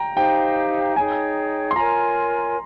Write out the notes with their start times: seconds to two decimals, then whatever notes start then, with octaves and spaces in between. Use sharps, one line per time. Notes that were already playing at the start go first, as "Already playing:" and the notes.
Already playing: G5 A#5
0.16 D#4 G4 C5 F5 G5
0.96 D#4 G#4 C#5 G5 G#5
1.71 C6
1.76 F4 A#4 C#5 G#5 A#5